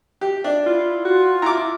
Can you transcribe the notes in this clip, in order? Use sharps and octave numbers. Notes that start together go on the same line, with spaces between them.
G4
D4
E4 F4
F4 F#4
E4 A#5 D6